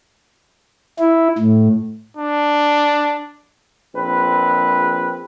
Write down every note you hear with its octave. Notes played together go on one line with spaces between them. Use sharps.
E4
A2
D4
A#1 C4 B4